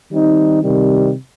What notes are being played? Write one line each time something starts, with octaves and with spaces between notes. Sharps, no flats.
D#3 G3 C4 D#4
C3 D#3 G3